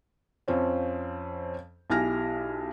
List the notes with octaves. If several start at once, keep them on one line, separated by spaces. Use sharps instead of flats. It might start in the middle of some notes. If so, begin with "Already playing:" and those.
F2 F3 C4 C#4
B1 E4 G4 G#5 F6 A#6